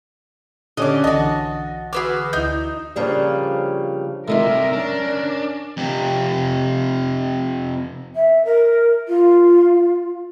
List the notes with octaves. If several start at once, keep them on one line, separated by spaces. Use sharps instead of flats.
A#2 D3 C#4 D4 G4 D#5 D6
B1 D3 E3 F#4 D#5 A5
F#4 G#4 B4 D6 E6 F6
D2 D#4 E4 G6
C#3 F3 G3 A#3 D4
C2 C3 A3 D#4 F4 A#4 E5
C#4 D4
F2 C3
E5
A#4
F4